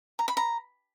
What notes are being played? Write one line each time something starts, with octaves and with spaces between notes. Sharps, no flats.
A#5
B5
A#5